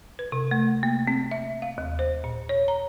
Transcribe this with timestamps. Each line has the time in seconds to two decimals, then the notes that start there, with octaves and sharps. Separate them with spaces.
0.19 B4
0.32 C3
0.51 A3
0.83 A#3
1.07 C4
1.31 E5
1.62 F5
1.78 D#2
1.99 C5
2.24 A#2
2.49 C#5
2.68 A#5